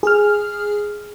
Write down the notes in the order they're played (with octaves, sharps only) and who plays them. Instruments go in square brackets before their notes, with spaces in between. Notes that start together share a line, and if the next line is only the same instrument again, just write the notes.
[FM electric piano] G#4 F6